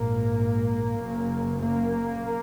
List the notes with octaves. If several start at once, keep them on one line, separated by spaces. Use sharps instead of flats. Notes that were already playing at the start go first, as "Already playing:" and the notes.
Already playing: A#1 G#2 A#3
F#1 F#2 C#3
A#3